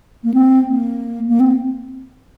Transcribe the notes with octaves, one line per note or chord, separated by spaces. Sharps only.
A#3
C4
A#3
A#3
C4